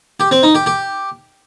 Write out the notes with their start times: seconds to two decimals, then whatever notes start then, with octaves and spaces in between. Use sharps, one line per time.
0.20 G4
0.31 C4
0.43 D#4
0.55 G4
0.66 G4